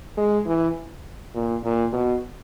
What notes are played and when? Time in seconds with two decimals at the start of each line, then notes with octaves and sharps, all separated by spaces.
0.17 G#3
0.47 E3
1.35 A#2
1.64 A#2
1.93 B2